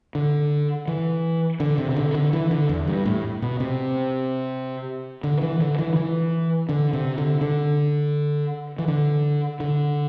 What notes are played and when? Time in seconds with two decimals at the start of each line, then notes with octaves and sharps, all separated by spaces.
0.15 D3
0.88 E3
1.60 D3
1.78 C3
1.91 C3
1.97 D3
2.15 D3
2.33 E3
2.51 D3
2.69 E2
2.87 G2
3.06 A2
3.42 B2
3.60 C3
5.24 D3
5.42 E3
5.61 D3
5.79 E3
5.96 E3
6.69 D3
6.93 C3
7.18 D3
7.41 D3
8.79 E3
8.88 D3
9.60 D3